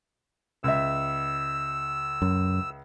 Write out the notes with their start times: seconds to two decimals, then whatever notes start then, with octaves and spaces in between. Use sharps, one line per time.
0.64 C#2 E5 E6
2.22 F#2